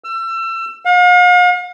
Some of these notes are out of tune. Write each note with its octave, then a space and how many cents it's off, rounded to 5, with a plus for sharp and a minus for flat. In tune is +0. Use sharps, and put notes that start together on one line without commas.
E6 +30
F5 +45